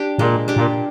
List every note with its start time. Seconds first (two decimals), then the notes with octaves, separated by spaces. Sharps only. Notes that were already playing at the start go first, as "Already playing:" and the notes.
Already playing: D4 G4
0.18 A#2 G#3
0.48 D4 G4
0.56 A#2